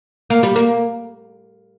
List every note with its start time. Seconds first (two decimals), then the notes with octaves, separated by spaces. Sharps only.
0.30 A#3
0.43 G3
0.56 A#3